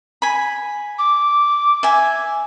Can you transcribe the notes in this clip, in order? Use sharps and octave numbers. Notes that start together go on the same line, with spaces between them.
G#5 B5
D6
E5 G#5